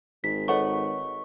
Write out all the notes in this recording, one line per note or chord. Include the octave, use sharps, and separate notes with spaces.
G#1 B6
A4 B4 C#5 D#5 F#5 C#6